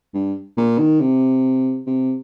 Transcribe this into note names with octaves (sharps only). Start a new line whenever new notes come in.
G2
A#2
D#3
C3
C3